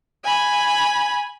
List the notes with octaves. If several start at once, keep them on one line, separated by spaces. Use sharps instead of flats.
G#5 B5